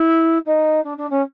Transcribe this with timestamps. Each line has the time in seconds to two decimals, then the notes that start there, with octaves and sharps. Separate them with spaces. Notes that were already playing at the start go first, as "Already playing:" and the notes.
Already playing: E4
0.46 D#4
0.84 D4
0.97 D4
1.10 C#4